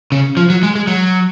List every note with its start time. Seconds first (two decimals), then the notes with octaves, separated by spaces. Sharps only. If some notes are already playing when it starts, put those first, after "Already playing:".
0.12 C#3
0.37 F3
0.50 F#3
0.63 G#3
0.75 G#3
0.87 F#3